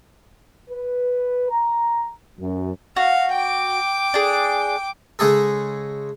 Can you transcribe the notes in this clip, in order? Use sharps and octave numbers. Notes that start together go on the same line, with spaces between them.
B4
A#5
F#2
F#4 F5
G5 D6
D4 G#4
C#3 G#3 G#4 A4